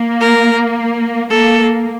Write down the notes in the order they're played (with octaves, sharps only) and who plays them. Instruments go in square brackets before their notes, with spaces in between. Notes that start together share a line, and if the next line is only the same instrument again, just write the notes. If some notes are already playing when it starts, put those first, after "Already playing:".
Already playing: [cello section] A#3
[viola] A#4
[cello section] A#3 [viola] A4